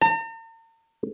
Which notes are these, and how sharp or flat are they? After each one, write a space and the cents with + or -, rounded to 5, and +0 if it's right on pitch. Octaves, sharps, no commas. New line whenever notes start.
A#5 -45